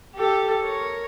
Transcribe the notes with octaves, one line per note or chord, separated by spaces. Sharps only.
G4 A4
A#4 C#5